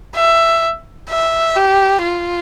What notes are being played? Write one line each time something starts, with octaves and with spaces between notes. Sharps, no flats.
E5
E5
G4
F4